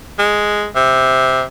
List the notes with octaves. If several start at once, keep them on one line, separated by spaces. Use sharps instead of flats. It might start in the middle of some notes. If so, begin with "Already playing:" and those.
G#3
C3